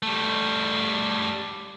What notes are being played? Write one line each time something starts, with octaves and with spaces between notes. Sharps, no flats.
G3 A3